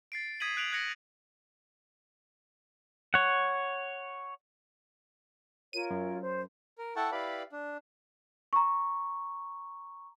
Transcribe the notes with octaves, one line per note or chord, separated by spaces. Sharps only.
A6 C7 D7
D#6 G#6 B6 D#7 F#7
F#6 D7 F7 F#7
F#6 G#6 A#6 C#7 F#7
C#5 F#5
F4 A#4 C#5 D#7
F#2
C5
A#4
E4 A4 F#5 G5 A5 C#6
E4 G4 B4 D5 F5 B5
D4
A#5 C#6